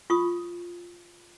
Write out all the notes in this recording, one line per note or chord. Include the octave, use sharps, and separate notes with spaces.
F4 C#6 D#6